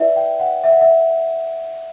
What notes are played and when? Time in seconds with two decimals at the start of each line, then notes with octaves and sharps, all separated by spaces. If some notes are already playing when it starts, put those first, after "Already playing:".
Already playing: E4 B4 D5 E5
0.16 G5
0.39 F#5
0.64 E5
0.72 F#5
0.81 E5